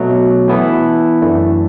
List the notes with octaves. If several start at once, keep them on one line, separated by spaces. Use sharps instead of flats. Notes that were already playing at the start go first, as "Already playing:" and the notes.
Already playing: B2 F#3 A3
E3 B3 E4 A4
F#2 E3 A3 D4